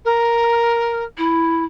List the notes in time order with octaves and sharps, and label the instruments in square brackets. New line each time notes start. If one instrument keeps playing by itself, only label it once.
[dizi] A#4
[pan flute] E4